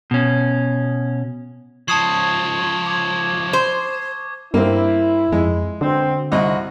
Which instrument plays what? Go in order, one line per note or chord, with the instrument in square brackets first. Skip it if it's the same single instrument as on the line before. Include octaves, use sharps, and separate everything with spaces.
[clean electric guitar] B2 C#4
[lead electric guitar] C#2 F3 [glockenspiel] A5 D#6 C7 [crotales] C#6 G#6
[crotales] D6 G#6
[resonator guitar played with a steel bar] C5
[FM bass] G2 [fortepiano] A#3 C4 [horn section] E4
[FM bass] F2 [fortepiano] G#3
[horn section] B2 C4 [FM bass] D3
[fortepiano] C2 D#5 [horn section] F3 C4 F#4